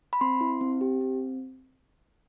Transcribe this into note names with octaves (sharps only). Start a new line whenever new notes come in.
B5
C4 C6
E4
C4
G4
C4